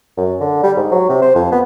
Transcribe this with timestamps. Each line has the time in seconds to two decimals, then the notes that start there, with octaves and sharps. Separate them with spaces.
0.17 F#2
0.40 D3
0.63 G3
0.77 G#2
0.92 F#3
1.09 C3
1.22 C5
1.35 F2
1.52 B3